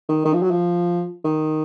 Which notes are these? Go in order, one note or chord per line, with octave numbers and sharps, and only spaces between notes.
D#3
D#3
F3
F#3
F3
D#3